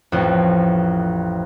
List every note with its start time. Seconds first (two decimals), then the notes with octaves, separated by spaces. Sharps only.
0.12 A1 F2